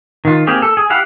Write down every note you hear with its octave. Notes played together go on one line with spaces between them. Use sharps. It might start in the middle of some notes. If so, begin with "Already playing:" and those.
D#3 F4
A#3 C4 G4 G#4
A4
G#4
E4 G4 F5 F#5